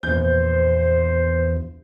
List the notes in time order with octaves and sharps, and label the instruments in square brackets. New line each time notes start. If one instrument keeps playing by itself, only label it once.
[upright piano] A#1 B3 G6 [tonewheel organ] E2 [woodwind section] C5